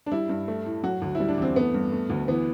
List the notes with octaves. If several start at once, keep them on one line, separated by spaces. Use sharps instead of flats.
D4
G3 E4
G2
A3
A2
F#3 F#4
D2
E4
G3
D4
E2 C4
A3 B3
G2
A3
D2
E3 B3